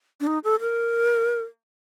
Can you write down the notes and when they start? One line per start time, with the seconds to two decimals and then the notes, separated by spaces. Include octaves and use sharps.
0.20 D4
0.27 D#4
0.44 A4
0.60 A#4